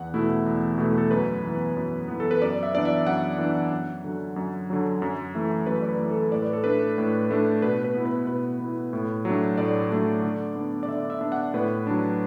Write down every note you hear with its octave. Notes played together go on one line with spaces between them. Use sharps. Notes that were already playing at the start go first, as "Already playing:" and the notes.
Already playing: E2 F#5
B2 A3 E4
E2
B2 A3 E4
A4
F#2 B4
E3 B3
F#2
E3 B3
A4
B4
F#2 D5
E5
E3 B3 D4 D5
E5
F#2 F#5
E3 B3 D4
F#2
D3 F#3
F#2
D3 F#3
F#2
E3 A3
F#2 B4
D5
B4
E3 A3
A4
A2 D5
B4
A4
A3 D4 B4
A2
A3 D4
B2 B4
B4
B3 E4
B4
B2 B4
B3 E4
A2
F#3 A3 D4
A2 D5
F#3 A3 D4
D3
B3 D4
D5
D3 E5
E5
B3 D4
F#5
A2 B4
F#3 D4